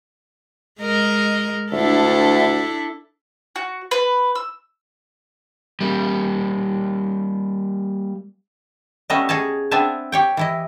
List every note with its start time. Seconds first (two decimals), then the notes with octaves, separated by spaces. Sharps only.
0.81 G#3 A#4 D#5
1.72 D2 D4 E4 A4
3.56 F#4
3.91 B4
4.35 E6
5.81 G3 A#3
9.10 G3 A3 B3 C#4 D#5 E5
9.29 G#4 C#5 D#5 A5
9.71 B3 C4 D4 E5 G#5 A5
10.12 G4 C#5 G5
10.37 E3 E4 D#5